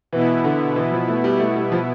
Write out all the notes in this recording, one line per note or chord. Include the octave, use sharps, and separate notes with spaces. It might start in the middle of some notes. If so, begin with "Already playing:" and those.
B2 E3 B3 E4
D3
E3
F3
A3
G3
A3
G3
F3